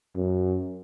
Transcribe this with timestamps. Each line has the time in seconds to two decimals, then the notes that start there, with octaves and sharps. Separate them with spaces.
0.15 F#2